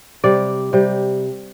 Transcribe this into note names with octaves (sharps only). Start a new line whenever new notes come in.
C3 G3 D5
C3 G3